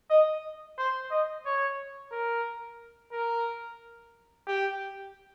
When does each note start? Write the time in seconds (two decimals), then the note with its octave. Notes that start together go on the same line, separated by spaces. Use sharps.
0.10 D#5
0.78 C5
1.11 D#5
1.46 C#5
2.12 A#4
3.12 A#4
4.47 G4